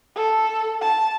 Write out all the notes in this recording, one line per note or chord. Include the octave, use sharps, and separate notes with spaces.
A4
A5